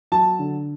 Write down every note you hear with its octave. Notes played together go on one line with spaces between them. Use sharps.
F#3 A5
D3